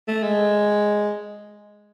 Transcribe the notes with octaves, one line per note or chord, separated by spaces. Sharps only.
A3
G#3